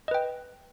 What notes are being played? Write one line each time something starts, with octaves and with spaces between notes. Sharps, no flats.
B4 D#5 G5